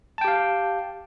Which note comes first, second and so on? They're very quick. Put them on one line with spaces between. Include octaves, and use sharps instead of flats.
A5 G5 G4 F5